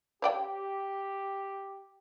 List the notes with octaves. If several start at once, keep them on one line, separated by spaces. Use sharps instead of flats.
G4 C#5 D5 G5